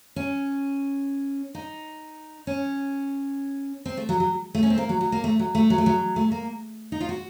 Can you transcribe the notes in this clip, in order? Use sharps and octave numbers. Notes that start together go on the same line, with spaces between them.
C#4
D#4
C#4
C4
A3
F#3
F#3
A3
C#4
C4
A#3
F#3
F#3
A#3
A3
F#3
A3
F#3
A3
F#3
A3
A#3
D#4
F4
F#4